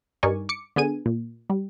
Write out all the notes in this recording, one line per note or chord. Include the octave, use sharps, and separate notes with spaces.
G2 D#4 A#4 D5 G#5 C#6
D6 C#7
D3 B3 G#4 G#5 D#7
A#2
G3